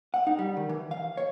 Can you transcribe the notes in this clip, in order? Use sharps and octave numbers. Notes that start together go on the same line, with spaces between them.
F#5
D#4
G3
D#3
E3
F5
C#5